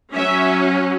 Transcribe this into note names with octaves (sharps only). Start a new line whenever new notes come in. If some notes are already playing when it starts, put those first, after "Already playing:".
F#3 C#4 E5